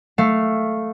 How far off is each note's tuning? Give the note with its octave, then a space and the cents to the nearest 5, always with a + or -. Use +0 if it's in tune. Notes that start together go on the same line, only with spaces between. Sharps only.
A3 +0 F5 +0